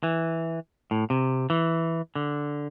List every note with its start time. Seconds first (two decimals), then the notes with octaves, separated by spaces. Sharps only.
0.03 E3
0.91 A2
1.10 C3
1.50 E3
2.15 D3